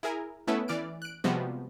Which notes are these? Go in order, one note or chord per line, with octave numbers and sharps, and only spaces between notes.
E4 G#4 A#4 G#5
A3 B3 C#4 E4 A4 B4
E3 D5 F6 D7
F#6 D7
C3 F3 G3 G#3 B3 F#4